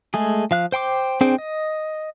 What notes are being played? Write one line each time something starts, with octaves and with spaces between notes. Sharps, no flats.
G#3 A3 G#4
F3 F5 F#6
C5 G5 C6 D6
C4 D4 G#4 C5 G5
D#5